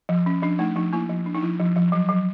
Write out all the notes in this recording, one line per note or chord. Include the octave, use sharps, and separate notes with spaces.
F3
C#4
F3 D4
A3 D#4
F3 D#4
A#3 E4
F3
D4
D#4
F3 E4
F3
F3
F#3
F#3